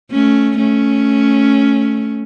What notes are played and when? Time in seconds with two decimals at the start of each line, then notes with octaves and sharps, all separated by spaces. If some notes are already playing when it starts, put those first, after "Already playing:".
0.11 A3 C#4
0.58 A3 C#4